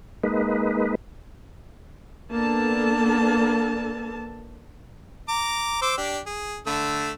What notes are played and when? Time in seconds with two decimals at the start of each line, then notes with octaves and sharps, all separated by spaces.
0.24 G#3 A#3 D#4 B4
2.33 A#3 B3 D4 A4 A5
5.28 A#5 D6
5.82 C5 D6 E6
5.97 D4 G4
6.26 G#4
6.67 D3 A3 E6